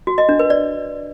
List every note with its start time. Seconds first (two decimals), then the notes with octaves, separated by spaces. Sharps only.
0.07 F#4
0.18 D#5
0.29 D4
0.39 B4
0.50 D5